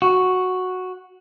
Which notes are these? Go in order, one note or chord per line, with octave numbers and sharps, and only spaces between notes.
F#4